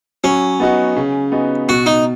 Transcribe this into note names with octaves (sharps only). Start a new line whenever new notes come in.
F#3 C#4
B3 D#4 F#4
C#3
B3 D#4 F#4
B2 F#4
D#4